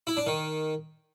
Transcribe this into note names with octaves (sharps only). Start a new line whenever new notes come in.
E4
D4
D#3